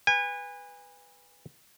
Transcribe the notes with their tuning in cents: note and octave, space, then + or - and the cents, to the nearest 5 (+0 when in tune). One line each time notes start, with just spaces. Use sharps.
B4 +0 G#5 -30